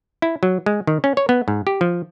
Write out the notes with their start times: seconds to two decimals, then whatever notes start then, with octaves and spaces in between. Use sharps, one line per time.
0.22 E4
0.43 F#3
0.66 G#3
0.87 D#3
1.04 C#4
1.17 C#5
1.29 B3
1.48 G#2
1.67 G4
1.81 F3